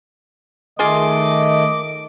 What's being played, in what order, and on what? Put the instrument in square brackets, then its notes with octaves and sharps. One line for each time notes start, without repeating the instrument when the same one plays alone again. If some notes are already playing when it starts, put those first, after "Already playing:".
[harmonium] D#3 A3 [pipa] F4 G#4 C6 [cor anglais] D#5 [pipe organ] D6